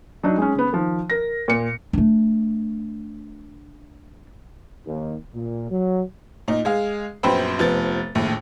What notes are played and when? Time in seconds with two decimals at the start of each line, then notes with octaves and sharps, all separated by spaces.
0.23 F#3 D4 D#4
0.38 G#3 C#4
0.55 C#3 B3
0.72 D#3 F3
1.10 A#4 A#6
1.48 A#2 C#7
1.93 A3 D4
4.86 D#2
5.34 A#2
5.71 F#3
6.48 A#2 D#4
6.65 G#3 G#4 F5
7.23 A#1 F#2 B3 C5 G5 B5
7.59 F1 F3 B3 A6
8.15 A#1 D#2 A2